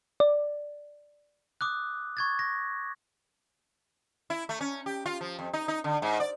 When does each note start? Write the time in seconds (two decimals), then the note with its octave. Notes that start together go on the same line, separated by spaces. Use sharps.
0.20 D5
1.61 D6 D#6 F#6
2.17 C#6 G#6 A6
2.39 A#6
4.30 E4
4.49 A3
4.61 C#4
4.86 G4
5.06 F4
5.21 F3
5.39 F2
5.53 D#4
5.68 D#4
5.84 D3
6.02 G#2
6.20 D5